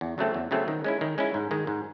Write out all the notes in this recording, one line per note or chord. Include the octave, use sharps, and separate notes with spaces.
E2
C#3 F#3 A3 C4
E2
C#3 F#3 A3 C4
D#3
G#3 C#4 E4
D#3
G#3 C#4 E4
G#2
D#3 G#3
G#2